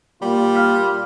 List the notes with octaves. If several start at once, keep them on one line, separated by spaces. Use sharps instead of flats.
A#2 G3 F4
F5 F6